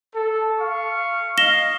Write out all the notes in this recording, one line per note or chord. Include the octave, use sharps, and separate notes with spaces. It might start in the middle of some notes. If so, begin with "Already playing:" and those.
A4
F5 C#6
D#5 F5 A#6 E7 G7